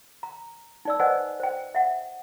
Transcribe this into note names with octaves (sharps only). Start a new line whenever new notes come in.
A#5
D#4 D5 E6
B4 C5 D5 D#5 F#5 G#5
C5 G5
E5 F#5